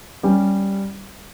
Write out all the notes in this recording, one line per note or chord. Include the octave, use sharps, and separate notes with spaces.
G3 C#4 G4